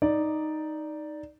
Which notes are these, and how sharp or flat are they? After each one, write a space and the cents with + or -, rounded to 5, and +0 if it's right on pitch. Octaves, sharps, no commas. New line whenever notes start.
D#4 +0 D5 +0